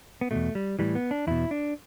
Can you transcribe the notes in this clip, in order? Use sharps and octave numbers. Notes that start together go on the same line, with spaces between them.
B3
E2 B2 A3
G3
A2 E3 G3
B3
D4
E2 B2 E4
D4